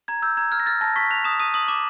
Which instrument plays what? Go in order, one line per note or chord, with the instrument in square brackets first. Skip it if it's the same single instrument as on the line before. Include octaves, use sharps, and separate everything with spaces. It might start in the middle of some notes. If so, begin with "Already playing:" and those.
[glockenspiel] A#5 G#6
E6 G6
A#5 G#6
F6 G#6
A#6
F6 A6
A5 A#6
C#6 B6
F#6 F7
D#6 E7
D#6 D#7
D#6 F#7
D6 E7